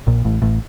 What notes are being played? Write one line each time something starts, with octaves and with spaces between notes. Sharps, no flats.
A#1 A#2
A1 A2
A1 A2